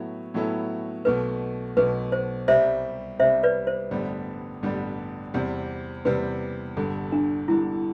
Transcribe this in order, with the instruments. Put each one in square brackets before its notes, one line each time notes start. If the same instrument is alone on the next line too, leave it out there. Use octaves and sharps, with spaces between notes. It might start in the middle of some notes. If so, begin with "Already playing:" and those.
Already playing: [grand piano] A2 F#3 B3 E4 A4
A2 F#3 B3 E4 A4
[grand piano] B1 B2 A3 [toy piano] B4
[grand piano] B1 B2 A3 [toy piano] B4
[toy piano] C5
[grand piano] C2 C3 G3 [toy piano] C5 E5
[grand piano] C2 C3 G3 [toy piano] C5 E5
[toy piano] B4 D5
C5
[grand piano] A1 G2 D3 G3 B3
A1 G2 D3 G3 B3
E2 C3 G3 C4
[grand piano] E2 C3 G3 C4 [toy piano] B4
[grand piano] G1 G2 D3 [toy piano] A4
[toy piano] D4
[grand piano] G1 G2 D3 [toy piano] E4